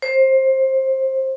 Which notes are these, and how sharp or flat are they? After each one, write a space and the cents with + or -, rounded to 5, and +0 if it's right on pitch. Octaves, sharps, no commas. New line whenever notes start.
C5 +20